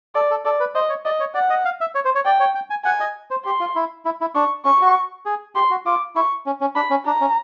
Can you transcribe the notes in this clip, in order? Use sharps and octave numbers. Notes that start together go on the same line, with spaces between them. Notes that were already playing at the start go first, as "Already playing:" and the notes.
A4 D5
A4
A4 D5
B4
C5 D#5
C#5
D5 D#5
C#5
D5 F#5
D#5
F5
E5
C#5
C5
C#5
D5 G5
C#5
G5
G#5
F#5 G#5
D#5
C5
G4 C6
F4
E4
E4
E4
D4 C#6
C#4 C#6
F#4
G#4
G4 C6
F#4
F4 D6
E4 C#6
C#4
C#4
D4 B5
C#4
D4 A#5
C#4